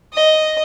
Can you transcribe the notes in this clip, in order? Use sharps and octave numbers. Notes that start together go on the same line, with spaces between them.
D#5